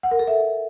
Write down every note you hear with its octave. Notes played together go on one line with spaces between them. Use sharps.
F#5
A#4
A4
E5